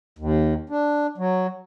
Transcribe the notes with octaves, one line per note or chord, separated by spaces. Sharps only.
D#2
D4
F#3